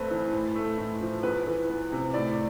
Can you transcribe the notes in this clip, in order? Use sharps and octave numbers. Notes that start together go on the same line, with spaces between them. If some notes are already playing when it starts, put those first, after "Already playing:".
Already playing: G2 A3 C4 B4 C5
E3
A2
A3
A2
F3
E2 B4
E3
B3
C3
A2 D5